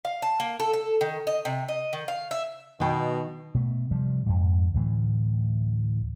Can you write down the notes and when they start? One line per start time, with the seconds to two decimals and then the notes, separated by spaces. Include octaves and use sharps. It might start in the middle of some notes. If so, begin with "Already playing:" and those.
0.05 F5
0.22 A5
0.40 A#3
0.60 A4
0.73 A4
1.01 D#3
1.27 D#5
1.45 C3
1.68 D#5
1.93 D#3
2.08 F5
2.31 E5
2.80 B2 D#3 G5
3.54 B2 A3
3.91 C3 F3 G3
4.26 F2 G#2
4.74 D2 A2 E3